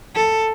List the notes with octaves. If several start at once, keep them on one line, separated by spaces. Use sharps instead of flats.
A4